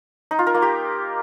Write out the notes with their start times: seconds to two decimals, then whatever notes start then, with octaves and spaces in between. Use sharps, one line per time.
0.31 D#4
0.39 F4
0.47 A#4
0.54 A#3
0.62 G4